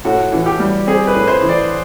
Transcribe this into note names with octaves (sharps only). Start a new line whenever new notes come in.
A2 F#4
E3
G4
G3
C4 G#4
B4
A2
C5
E3
D5